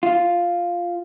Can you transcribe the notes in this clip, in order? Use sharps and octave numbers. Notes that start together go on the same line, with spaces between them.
F4